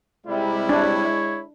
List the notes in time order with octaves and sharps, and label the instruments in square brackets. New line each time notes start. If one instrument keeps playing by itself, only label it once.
[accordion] C3 G3 [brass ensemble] G#3 E4
[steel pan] D4 [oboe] C#5